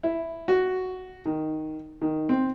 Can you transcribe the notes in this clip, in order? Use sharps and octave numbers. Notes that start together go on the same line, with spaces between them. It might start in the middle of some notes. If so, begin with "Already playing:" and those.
E4
F#4
D#3
D#3
C4